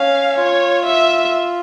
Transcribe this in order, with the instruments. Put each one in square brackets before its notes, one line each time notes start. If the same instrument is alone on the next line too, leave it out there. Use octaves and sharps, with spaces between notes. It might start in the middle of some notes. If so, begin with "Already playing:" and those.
Already playing: [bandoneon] C#4 [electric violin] F5
[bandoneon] F4 [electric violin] C#5
[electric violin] E5